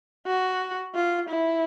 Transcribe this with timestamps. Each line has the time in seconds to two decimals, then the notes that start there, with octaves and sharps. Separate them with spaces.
0.27 F#4
0.95 F4
1.29 E4